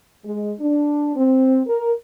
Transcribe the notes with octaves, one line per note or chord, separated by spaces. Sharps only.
G#3
D4
C4
A#4